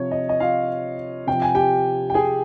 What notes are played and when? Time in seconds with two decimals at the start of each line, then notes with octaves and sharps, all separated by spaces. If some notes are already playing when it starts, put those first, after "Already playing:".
Already playing: C3 F3 C#5
0.11 D#5
0.29 D#5
0.40 F4 F5
1.27 C3 F3 G5
1.42 G#5
1.55 G4 G5
2.10 G5
2.14 G#4 G#5